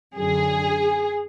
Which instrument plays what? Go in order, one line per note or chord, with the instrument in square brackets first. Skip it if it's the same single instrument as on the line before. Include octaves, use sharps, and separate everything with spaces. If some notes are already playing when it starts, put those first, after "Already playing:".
[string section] F#2 D3 G#4